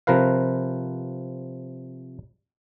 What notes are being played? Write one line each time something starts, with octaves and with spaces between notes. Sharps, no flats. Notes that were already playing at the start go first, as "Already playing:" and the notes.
C3 F3 A#4 B4 F5